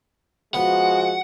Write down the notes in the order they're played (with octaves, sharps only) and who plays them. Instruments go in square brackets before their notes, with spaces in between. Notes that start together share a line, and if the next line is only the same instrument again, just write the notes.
[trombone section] F3 G#3 [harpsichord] B3 [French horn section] F#4 [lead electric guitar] F#5